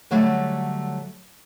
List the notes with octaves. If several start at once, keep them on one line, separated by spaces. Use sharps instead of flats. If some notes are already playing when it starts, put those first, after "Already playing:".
D3 F#3 G3 A3